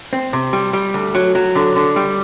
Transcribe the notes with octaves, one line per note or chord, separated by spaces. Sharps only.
C4
C3
G3
G3
D2
F#3
F#3
D3
D3
G3